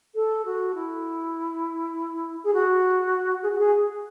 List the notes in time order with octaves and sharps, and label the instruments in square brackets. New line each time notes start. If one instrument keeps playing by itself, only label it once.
[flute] A4
F#4
E4
G#4
F#4
G#4
F#4
G#4